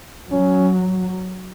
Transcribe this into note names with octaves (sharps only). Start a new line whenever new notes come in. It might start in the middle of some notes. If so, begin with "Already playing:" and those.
F#3 C#4